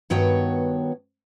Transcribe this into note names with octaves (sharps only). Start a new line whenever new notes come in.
G2 D#3 B3 F#4 C#5 G5